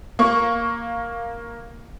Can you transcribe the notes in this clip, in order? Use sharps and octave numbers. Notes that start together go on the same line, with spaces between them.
A#3 C#6